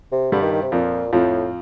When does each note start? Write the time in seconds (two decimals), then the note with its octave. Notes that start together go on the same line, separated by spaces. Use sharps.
0.12 C3
0.32 G2 D3 G3
0.42 D#3
0.52 D#3
0.62 C3
0.72 F2 A#2 F3
1.13 F2 A2 F3